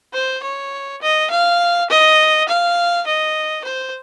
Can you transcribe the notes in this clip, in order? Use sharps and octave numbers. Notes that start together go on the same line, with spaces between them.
C5
C#5
D#5
F5
D#5
F5
D#5
C5